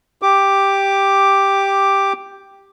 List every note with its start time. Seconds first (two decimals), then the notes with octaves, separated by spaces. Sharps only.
0.22 G4 D6